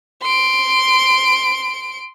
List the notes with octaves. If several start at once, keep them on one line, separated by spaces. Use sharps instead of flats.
C6 D7